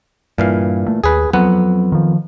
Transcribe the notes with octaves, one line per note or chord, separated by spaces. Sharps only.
G2 A#2 E3 F5
A3
D#2 G#4 B4
F2 F#3 B3 F#5
D#3 F3